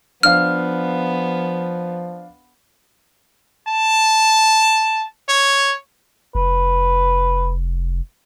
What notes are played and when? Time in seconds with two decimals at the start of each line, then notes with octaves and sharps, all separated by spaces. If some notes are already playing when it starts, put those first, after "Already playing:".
0.23 F3 B3 D4 F5 F6
3.68 A5
5.29 C#5
6.35 F1 B4